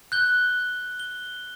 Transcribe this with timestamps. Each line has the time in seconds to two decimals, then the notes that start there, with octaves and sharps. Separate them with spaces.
0.12 F#6 G6 G7
1.00 G7